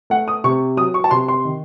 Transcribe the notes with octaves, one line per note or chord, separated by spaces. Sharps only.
A3 F#5
D#6
C3 C#6
F#3 D#6
C#6
A5
C3 C6
C6
D#3